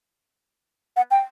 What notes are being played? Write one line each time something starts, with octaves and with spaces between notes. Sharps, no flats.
F#5
G5